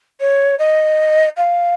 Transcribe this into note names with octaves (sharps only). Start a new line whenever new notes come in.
C#5
D#5
F5